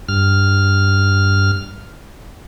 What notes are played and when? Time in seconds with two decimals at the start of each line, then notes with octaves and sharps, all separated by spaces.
0.08 G2 F6